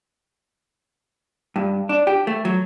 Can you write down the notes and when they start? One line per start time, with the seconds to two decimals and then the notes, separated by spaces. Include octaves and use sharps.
1.56 G2
1.89 D4
2.07 G4
2.27 A3
2.45 F#3